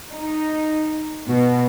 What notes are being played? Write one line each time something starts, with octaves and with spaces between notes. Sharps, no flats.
D#4
B2